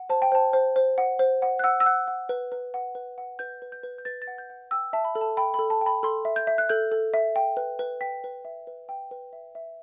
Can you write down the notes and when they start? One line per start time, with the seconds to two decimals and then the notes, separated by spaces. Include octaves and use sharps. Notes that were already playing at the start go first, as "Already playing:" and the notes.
Already playing: F#5
0.10 C5 A5
0.22 G5
0.32 C5 A5
0.53 C5
0.76 C5
0.98 F#5
1.19 C5
1.42 F#5
1.59 F#6
1.64 F#5 E6
1.80 E6
1.86 F#5 F#6
2.08 F#5
2.29 B4
2.52 B4
2.74 F#5
2.95 B4
3.18 F#5
3.39 B4 G6
3.62 B4
3.72 G6
3.83 B4
3.98 G6
4.05 B4 A6
4.22 A6
4.27 F#5
4.38 G6
4.50 F#5
4.71 G5 E6
4.93 E5 A5
5.05 B5
5.15 A4
5.21 A5
5.37 G5 B5
5.54 B5
5.59 A4
5.70 A5
5.81 G5
5.86 B5
6.03 A4 C6
6.25 E5
6.36 G6
6.47 E5
6.58 F#6
6.69 A4 G6
6.92 A4
7.14 E5
7.36 G5
7.57 B4
7.79 B4
8.01 G5 B6
8.24 B4
8.45 E5
8.67 B4
8.89 G5
9.11 B4
9.33 E5
9.55 E5